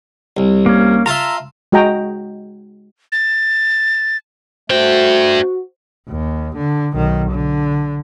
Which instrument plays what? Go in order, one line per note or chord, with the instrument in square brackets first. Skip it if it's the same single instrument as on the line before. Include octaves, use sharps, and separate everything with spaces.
[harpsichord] C2
[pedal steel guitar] A#3 C#4
[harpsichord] F4 A5 C6 [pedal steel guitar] E5 A#5
[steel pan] G#3 F#4 D#5 G5 A#5
[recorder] A6
[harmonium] A3 [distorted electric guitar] D4 G5 [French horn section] F#4 [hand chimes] C5
[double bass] D#2
D3
B1 D#3
D3